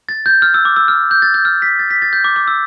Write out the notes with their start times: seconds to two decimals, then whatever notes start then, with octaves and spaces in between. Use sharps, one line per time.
0.09 A6
0.26 G6
0.42 F6
0.54 E6
0.65 D6
0.76 E6
0.88 F6
1.11 G6
1.22 A6
1.34 G6
1.45 F6
1.62 B6
1.79 A6
1.90 B6
2.02 A6
2.13 G6
2.24 D6
2.36 D6
2.48 E6